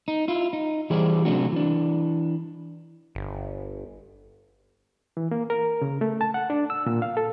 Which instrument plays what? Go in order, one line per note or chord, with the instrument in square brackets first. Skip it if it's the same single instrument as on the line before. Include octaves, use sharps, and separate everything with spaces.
[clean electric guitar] D#4
E4 F4
D#4
E3 G3 G#4 C5 D5
C3 F#3 A3 C#4 D4 F#4
E3 D4
[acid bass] G1
[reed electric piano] E3
A#3
A#4
C#3
A3
A5
F#5
D4
E6
A#2
F5
A4